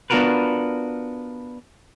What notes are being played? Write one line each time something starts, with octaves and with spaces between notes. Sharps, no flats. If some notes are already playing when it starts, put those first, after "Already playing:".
B3 D4 F4 F#4 A#4 B4